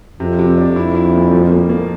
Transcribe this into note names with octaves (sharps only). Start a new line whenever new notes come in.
F2 C3
C3
D4
F2 E4
E4
A#2
F3
A#3
A#3